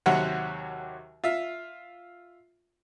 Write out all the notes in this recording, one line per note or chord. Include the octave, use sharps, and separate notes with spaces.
D#2 C3 F#3 F#4 G4 F#5
F4 E5